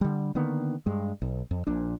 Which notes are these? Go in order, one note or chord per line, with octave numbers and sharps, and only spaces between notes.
D3 G3
D3 D#3 A#3 B3
G2 G#3
B1
F2
A#1 A#2 D4